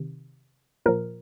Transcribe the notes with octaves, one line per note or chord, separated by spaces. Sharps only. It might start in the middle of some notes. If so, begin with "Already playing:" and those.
Already playing: C3 D#3
A#2 F3 A#4